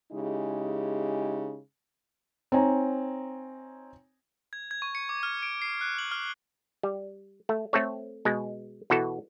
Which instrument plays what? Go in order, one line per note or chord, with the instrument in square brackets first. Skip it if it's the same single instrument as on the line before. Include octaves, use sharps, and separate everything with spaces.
[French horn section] C#3 G#3 D#4 E4 G4 G#4
[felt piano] C4 D#4 C#5 G#5 A#5
[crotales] G#6
G#6
C#6
C#7
D6
F6
D7
C7
F#6
F#7
F6
[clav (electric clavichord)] G3
A3
A3 C4 A4 C#5
B2 G#3
B2 E3 F#4 A4